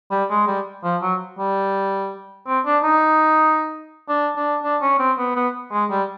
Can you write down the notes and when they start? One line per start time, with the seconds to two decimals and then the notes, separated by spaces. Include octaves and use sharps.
0.11 G3
0.30 G#3
0.47 G3
0.84 F3
1.02 F#3
1.38 G3
2.47 C4
2.65 D4
2.83 D#4
4.09 D4
4.36 D4
4.64 D4
4.82 C#4
4.99 C4
5.18 B3
5.35 B3
5.72 G#3
5.90 G3